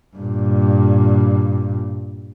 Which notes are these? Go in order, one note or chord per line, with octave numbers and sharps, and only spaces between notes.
G2 A#2